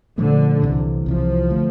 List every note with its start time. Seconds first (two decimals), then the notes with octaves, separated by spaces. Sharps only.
0.18 A#2 D3 F3 A3
0.62 C2 C3 E3
1.06 C2 C3 E3 F3
1.50 D3 A3